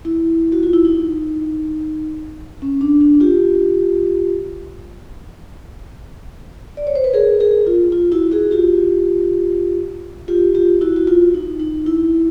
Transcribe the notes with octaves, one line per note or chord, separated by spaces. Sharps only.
E4
F#4
F4
E4
D#4
C#4
D4
D4
F4 G4
D5
C#5
C5
B4
G#4 A#4
G#4 A#4
F4
F4
E4 F#4
F#4 G#4
F4 G4
F4 G4
F4 G4
E4 F#4
F#4
F4
D#4
D#4
E4